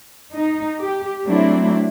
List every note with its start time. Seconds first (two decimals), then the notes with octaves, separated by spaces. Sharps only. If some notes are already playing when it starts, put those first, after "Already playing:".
0.34 D#4
0.81 G4
1.26 F#3 A3 C4 D4 E4